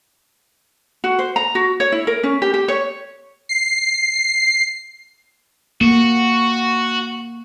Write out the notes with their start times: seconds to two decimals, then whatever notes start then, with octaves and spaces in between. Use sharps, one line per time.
1.04 F#4
1.19 C5
1.36 A#5
1.55 F#4
1.80 C#5
1.92 E4
2.07 A#4
2.23 C#4
2.42 G4
2.54 G4
2.68 C#5
3.49 C7
5.81 A#3 F#4